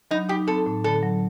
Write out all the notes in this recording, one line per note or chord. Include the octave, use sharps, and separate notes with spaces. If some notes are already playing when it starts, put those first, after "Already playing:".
F#3 D#4
D#4 G4
C4 A4
A2
D3 A4
F#3